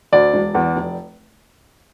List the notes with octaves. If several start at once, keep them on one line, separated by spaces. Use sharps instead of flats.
D2 D5
E1
E2
F1